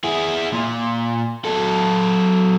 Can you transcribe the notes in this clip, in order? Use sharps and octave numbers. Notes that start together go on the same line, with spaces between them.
E4 G#4
A#2
F#3 A4